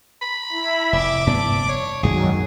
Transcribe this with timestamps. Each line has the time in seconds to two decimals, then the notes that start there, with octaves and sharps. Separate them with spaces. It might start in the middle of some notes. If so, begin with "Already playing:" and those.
0.21 B5
0.52 E4
0.93 F1 E5 D6
1.27 F1 G2 B3 D4
1.69 C#5
2.03 B1 F#2 D#3 F#3 G#3 G#4